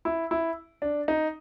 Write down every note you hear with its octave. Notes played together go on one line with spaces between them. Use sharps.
E4
E4
D4
D#4